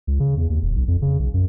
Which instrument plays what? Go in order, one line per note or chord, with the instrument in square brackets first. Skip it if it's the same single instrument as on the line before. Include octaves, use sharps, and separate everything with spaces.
[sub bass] C#2
C#3
E2
D#2
D#1
B1
F2
C#3
B1
F#2